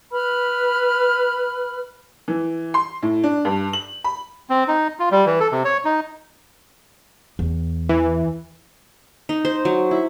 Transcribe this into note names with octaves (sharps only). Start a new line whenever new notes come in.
B4 B5 F6
E3
C6
A2
D4
G2
F#7
B5
C4
D#4
F4
G3
E3
A4
C3
C#5
D#4
E2
E3
D#4
C5
F#3
E4